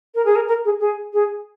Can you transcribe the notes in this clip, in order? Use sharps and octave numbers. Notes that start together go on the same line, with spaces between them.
A#4
G#4
A#4
A#4
G#4
G#4
G#4